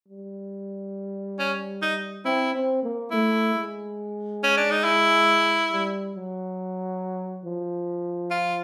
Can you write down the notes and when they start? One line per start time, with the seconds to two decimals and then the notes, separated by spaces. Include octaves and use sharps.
0.09 G3
1.39 C#4
1.82 D#4
2.25 C4 E4
2.54 C4
2.83 A#3
3.11 A3 E4
3.55 G#3
4.44 C#4
4.57 D4
4.71 D#4
4.84 E4
5.71 G3
6.14 F#3
7.44 F3
8.31 F4